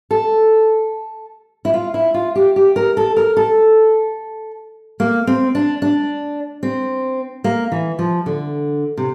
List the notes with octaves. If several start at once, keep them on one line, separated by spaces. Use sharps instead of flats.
A4
E4
F4
E4
F4
G4
G4
A#4
A4
A#4
A4
A#3
C4
D4
D4
C4
A#3
E3
F3
D3
C3